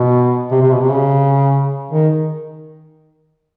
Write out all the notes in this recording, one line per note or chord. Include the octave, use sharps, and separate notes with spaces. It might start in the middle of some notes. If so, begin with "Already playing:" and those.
Already playing: B2
C3
C3
B2
C3
C#3
D#3